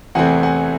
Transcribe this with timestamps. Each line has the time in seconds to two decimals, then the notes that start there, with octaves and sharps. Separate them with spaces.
0.15 E2 C3 E3 A3 C4 F#5 G#5
0.43 F#5 G#5